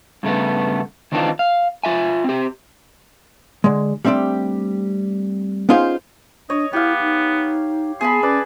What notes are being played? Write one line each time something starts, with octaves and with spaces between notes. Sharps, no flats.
G2 C#3 A3 B3
D#3 E3 C4 D4 D#4 F4
F5
F4 E5 G#5
C4 G4
D3 G#3
G3 A3 C4 D4 G4
B3 C#4 D#4 F4 G#4 C5
D4 C#5 D#5
B3 E4 G4 F5
D#4
B3 G#4 A5 B5 C6
C#4 B4 D5